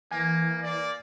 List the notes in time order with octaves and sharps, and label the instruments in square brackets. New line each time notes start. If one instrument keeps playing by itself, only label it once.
[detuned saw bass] E3 [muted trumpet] A#3 [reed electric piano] G#5 G#6
[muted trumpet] A#3 [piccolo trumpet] D5